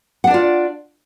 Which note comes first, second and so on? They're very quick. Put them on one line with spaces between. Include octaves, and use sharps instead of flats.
F#5 D4 D5 F4